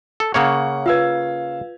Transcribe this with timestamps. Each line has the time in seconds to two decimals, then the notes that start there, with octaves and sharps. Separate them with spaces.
0.20 A4
0.34 C#3 A#3 C#5 F#5
0.86 F4 B4 F5 E6 G#6